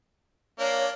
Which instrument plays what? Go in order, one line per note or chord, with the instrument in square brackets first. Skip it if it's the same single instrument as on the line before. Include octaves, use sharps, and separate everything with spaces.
[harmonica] A#3 D4 [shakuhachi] C#5